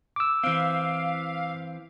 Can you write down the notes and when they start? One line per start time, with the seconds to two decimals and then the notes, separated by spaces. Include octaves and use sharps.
0.16 D6 E6
0.43 E3 C4 F5